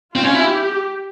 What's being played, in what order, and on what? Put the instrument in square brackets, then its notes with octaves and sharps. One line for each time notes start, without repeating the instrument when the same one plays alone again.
[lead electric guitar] C4 [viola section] F4
[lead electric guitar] C#4
E4
[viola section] G4